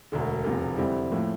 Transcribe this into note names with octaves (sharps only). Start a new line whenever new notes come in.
E1 D2 D3
F1 E2 C3 F3
F2 D3 G3 C4 E4
A2 F3 A#3 E4